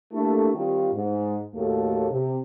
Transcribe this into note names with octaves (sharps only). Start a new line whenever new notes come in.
A3 A#3 D4 E4 G4 A4
D#3 G3 C4 F4
G#2
D#2 A2 A3 A#3 F#4 A4
C3